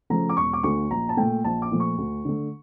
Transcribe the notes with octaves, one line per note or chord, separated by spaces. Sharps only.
C#3 F3 A3 A#5
D6
E1 C#6
D6
D2 D3 A3 C#6
A#1 A#5
A5
A#2 A3 G5
A#1 A5
D6
A#2 F3 A3
C#6
D2
D3 A3